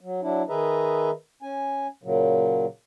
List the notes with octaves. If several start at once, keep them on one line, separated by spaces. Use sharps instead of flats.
F#3
F#3 D4 E4
D#3 G#4 B4 D#5 E5 A#5
C#4 G#5
A#2 C#3 F#3